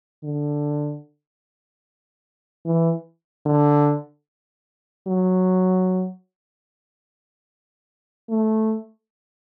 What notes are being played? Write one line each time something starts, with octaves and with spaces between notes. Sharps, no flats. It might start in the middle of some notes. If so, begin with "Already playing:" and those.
D3
E3
D3
F#3
A3